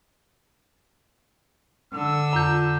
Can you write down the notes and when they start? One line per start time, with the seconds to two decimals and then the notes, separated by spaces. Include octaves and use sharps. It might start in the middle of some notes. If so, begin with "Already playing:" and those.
1.93 D3 E6
2.33 F2 F4 A#5 G6